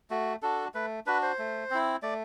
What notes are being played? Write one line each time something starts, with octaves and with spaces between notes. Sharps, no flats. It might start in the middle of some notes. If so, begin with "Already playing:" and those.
A3 F#4
D4 F#4 A4
A3 B4
D4 F#4 B4
C5
A3
C4 E4
A3 D5